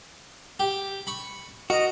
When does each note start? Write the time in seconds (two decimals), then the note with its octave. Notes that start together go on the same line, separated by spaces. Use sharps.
0.59 G4
1.07 B5 C#6
1.70 F#4 A#4 D#5